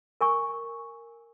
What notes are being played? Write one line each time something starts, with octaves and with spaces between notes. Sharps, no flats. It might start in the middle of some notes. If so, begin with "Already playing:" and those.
A#4 G#5 C#6